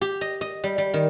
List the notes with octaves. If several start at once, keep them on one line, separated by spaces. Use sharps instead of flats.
G4
D#5
D#5
G3
G3
D#3